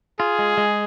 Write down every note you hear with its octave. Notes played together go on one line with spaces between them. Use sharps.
F4 G#4
G#3
G#3